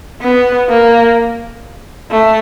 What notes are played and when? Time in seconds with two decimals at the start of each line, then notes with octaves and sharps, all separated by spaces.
0.22 B3
0.69 A#3
2.11 A3